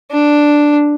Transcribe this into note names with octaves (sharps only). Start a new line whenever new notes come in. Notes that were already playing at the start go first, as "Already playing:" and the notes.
D4